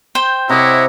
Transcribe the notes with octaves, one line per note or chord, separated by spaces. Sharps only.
C5 G5
C3 E4 C#5 D#5 F#5 D6